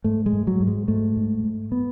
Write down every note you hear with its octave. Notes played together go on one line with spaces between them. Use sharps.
G#2 A3
G#3
G#2
F#3
G#2
G#3
G#2 A3
G#2
G#2
B3